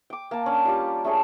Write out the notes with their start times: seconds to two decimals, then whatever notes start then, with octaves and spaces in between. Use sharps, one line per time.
0.10 G5 D6
0.31 A#3 A5
0.46 C#4 D4
0.65 G3 F4 G4
1.05 A3 D4 G#4 C#5